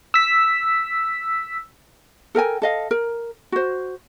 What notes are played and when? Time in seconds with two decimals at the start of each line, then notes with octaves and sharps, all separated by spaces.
0.14 E6 B6
2.35 A4 A#4 G5 G#5
2.62 A4 D#5 F5
2.91 A#4
3.52 F#4 C5